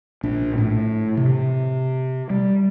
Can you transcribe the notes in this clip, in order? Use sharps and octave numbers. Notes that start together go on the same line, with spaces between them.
A#1 D4
A2 A3
C3
G3